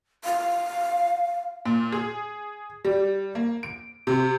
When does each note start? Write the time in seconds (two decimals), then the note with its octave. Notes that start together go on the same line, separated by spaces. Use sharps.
0.24 F5
1.65 A#2
1.92 G#4
2.85 G3
3.35 A#3
3.63 D7
4.07 C3